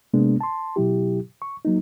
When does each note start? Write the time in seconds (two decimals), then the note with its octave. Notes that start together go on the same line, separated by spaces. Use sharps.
0.14 C3 G#3 A#3 B3 D4
0.41 A5 C6
0.76 B2 F#3 E4 G4
1.42 C#6
1.65 F#3 A#3 D#4